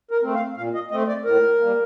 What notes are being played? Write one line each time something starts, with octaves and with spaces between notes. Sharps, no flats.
A#4
A3 C4
F5
A#2 F5
D#5
A3 C4 D#5
D5
A2 A#4
G3 A#3